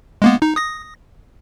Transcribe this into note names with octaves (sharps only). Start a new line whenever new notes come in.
G#3 A#3 B3
D#4
D#6 A#6